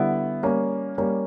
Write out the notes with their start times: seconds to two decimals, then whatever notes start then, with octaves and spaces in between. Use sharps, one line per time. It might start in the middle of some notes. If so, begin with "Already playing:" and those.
Already playing: D3 G3 B3 E4
0.43 G3 A#3 C#4
0.98 G3 A#3 C#4